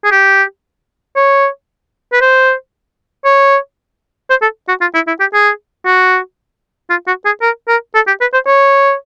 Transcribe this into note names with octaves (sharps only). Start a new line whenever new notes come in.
G#4
G4
C#5
B4
C5
C#5
C5
A4
F#4
F4
E4
E4
G4
G#4
F#4
F4
F#4
G#4
A#4
A#4
A4
G4
B4
C5
C#5